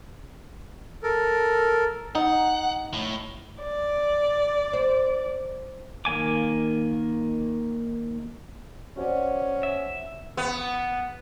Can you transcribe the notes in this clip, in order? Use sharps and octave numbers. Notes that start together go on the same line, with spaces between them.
A4 A#4
D#4 F#5
A2
D5
C5
D#3 A#3 G#5 D6
C#4 F#4 C5 D5
E5
B3